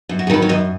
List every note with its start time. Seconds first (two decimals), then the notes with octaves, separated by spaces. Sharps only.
0.09 F#2
0.19 F#4
0.27 G#4
0.30 D#3 F#3 B4
0.42 C#5
0.49 F#2 D#5